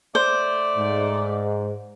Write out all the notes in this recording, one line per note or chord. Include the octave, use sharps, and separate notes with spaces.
A3 C5 D5
G#2